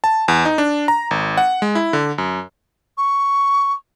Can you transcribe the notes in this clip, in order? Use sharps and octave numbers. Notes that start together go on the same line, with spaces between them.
A5
E2
D#4
D4
A#5
G#1
F#5
G#3
E4
D3
F#2
C#6